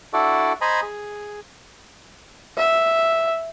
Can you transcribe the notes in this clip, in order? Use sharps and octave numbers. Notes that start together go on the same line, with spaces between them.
D4 E4 F#4 A4 D5
C5 D#5 G#5 A#5 B5
G#4
E5